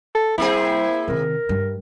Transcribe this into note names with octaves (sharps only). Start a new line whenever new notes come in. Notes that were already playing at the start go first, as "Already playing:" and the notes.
A4
G3 A#3 C4 E4 G#4 C5
C3 D#3 A#4
G2